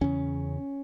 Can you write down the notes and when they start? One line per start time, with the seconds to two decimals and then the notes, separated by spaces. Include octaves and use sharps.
0.01 E2 C#3 C#4